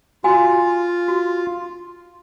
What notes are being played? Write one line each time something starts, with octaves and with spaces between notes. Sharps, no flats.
F4 F#4 F5 G#5
F#4